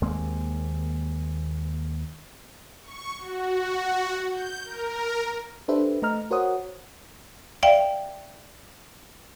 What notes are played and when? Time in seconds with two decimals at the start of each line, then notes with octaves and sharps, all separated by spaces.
0.02 D#2 G#3 A#3 C4
2.82 C#6
3.18 F#4
3.60 F#4
4.30 G6
4.64 A#4
5.68 D4 G4 A4 B4 C5 E5
6.02 A3 D#5 A#5 F6
6.31 F#4 A#4 C5 C#5 F#5 D#6
7.63 D5 E5 F5 G5